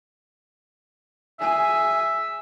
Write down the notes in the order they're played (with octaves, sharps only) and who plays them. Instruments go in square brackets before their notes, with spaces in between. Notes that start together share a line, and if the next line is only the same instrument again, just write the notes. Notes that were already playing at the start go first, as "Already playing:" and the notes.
[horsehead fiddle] G#4 G#5 [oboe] E5